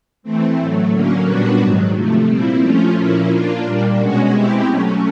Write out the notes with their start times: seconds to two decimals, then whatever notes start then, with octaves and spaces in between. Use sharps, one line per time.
0.23 E3 A3 C4
0.56 A2 F#3 A3
0.91 D3 F#3 A#3 C#4
1.25 A#2 G3 B3 D4 F#4
1.59 G#2 D#3 F#3
1.93 C3 F3 A3
2.27 A#2 G3 C4 E4
2.61 F3 A3 C#4 F4
2.95 A#2 F3 A#3 C#4 E4
3.29 A#3 D4 F4
3.63 A#2 G3 A#3 D4
3.97 B2 G#3 C#4 F#4
4.31 B2 G#3 C4 E4 G4
4.65 F#3 A3 C#4